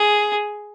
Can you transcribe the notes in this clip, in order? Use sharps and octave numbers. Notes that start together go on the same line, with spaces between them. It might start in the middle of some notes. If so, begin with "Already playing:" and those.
Already playing: G#4